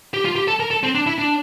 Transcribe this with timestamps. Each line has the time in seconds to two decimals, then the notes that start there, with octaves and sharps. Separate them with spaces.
0.14 G4
0.25 F4
0.36 G4
0.48 A4
0.60 A#4
0.71 A4
0.83 C4
0.95 D4
1.06 E4
1.18 D4